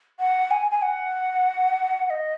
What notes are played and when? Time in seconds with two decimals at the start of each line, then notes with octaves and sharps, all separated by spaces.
0.20 F#5
0.51 G#5
0.71 G#5
0.82 F#5
2.05 F#5
2.10 D#5